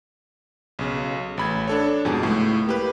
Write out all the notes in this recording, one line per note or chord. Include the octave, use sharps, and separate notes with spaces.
B1 C#3
A1 B5 G#6
D4 A4 C#5
F2 G#2 B2 G#4
C#2 A2
A#3 G4 B4